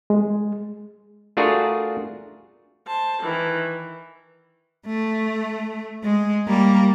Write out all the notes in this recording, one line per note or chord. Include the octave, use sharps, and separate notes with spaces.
G#3
A3 D4 F4 F#4 G#4 A#4
C5 A5
D#3 E3
A3
G#3
G3 A#3